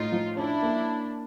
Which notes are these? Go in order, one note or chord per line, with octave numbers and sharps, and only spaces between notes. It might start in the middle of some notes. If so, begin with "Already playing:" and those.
Already playing: A2 D#4 F4
F3
C#4 D4 E4
A#3